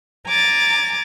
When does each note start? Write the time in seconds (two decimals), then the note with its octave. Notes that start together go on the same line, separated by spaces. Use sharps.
0.26 G#5 A#5 D6 A6